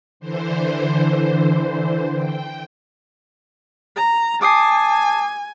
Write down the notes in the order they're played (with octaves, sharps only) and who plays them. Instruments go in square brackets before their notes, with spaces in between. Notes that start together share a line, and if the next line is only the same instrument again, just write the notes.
[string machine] D3 E3 C5
G5
[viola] A#5
[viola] G#5 [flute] A5 [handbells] D6 D#6 C7